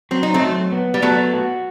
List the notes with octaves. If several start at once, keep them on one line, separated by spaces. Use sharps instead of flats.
F#3 C4
D#4
A3 C4
F#3
B3
G3
F#3 A3 B3
F#4